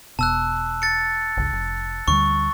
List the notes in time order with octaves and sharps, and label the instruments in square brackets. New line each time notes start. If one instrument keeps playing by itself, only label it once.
[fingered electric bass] E1 B2 [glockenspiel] A5 E6 F#6
[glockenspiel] A6 C#7
[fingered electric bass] G1 C#2
F1
[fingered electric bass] D2 D3 G3 [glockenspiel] C#6